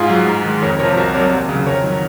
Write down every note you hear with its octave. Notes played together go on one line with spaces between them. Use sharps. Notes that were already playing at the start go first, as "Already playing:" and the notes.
Already playing: G#2 F4 G#4
F#3
G#2
D#3 G#3
F2 A#4 C#5
C3 F3 A#4 C#5
C2 F#4 A#4
C3 F#3 A#4 C#5
D#2
C#3 F#3
F2 A#4 C#5
D#3 F#3